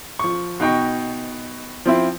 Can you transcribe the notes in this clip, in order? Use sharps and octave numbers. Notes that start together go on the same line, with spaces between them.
F3 C#6
B2 D#4 G5 C#6
F3 C4 E4